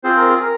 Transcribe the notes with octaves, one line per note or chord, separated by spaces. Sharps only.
C4 F4 G#4 C5
A#4
G#4
A#4